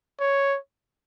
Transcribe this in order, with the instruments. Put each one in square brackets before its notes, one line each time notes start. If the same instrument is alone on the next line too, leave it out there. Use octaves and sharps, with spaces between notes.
[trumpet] C#5